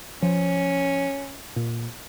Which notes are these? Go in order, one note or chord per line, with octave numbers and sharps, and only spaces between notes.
F3 C#4
A#2